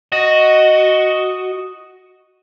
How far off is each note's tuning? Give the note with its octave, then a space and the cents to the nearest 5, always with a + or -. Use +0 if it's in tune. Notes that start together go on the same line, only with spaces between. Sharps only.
F#4 +0 D#5 +0